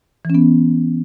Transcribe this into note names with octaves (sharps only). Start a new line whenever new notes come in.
E3 B3 C#4